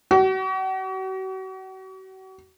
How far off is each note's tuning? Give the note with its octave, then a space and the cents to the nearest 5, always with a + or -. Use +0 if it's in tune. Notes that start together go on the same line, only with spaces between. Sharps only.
F#4 +40